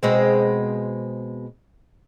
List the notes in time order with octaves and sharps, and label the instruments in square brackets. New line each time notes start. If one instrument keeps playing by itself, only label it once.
[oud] B2 G#3 C4